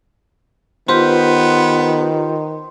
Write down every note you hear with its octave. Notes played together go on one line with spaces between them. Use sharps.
D#3 B3 F4 G4 B4 C5